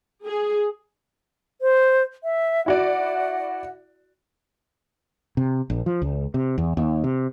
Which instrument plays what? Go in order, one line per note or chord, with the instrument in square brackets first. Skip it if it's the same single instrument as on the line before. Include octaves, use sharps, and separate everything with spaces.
[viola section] G#4
[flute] C5
E5
[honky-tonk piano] E4 F#4 D5 [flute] F#5
[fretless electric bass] C3
A#1
F3
C#2
C3
E2
D#2
C3